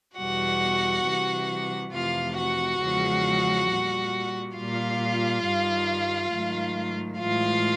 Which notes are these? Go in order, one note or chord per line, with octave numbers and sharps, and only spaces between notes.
E2 B2 G3 F#4 F#5
C3 E3 G3
F2 C3 E3 A3 F4 F5
F#4 F#5
E2 C#3 F3 G#3
A#2 G3
A#2 G3 F4 F5
G2 D#3 G3
G#2 D#3 F#3 A3
A2 E3 G#3 F4 F5